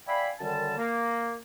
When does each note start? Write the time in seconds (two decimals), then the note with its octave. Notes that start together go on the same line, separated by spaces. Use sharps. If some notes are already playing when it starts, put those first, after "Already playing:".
0.07 D5 E5 F5 G5 G#5 B5
0.39 F#2 D3 D#3 G3 A5
0.78 A#3